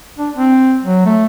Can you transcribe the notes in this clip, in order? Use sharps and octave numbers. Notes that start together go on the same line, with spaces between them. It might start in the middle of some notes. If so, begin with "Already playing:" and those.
D4
C4
F#3
A3